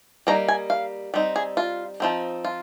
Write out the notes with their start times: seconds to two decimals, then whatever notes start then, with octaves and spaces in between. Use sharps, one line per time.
0.27 G3 A#3 D#4 A#5
0.48 G#5
0.70 F5
1.14 G3 C4 D#4
1.36 G#4
1.57 F4
2.00 F3 C4 D#4
2.45 F4